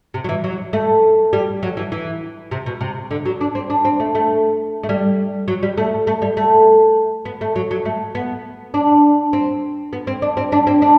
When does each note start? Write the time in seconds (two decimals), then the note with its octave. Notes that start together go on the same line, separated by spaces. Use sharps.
0.14 C3
0.24 F#3
0.29 E3
0.44 F#3
0.73 A3
1.33 G3
1.63 F#3
1.77 E3
1.92 E3
2.51 C3
2.66 B2
2.81 C3
3.11 D3
3.25 F#3
3.41 D4
3.55 C4
3.70 D4
3.85 C4
4.00 A3
4.15 A3
4.83 A3
4.89 G3
5.48 F#3
5.63 G3
5.78 A3
6.07 A3
6.22 G3
6.37 A3
7.25 B3
7.41 A3
7.56 F#3
7.71 F#3
7.85 A3
8.15 B3
8.74 D4
9.33 C4
9.93 B3
10.07 C4
10.22 D4
10.37 C4
10.52 D4
10.67 C4
10.82 D4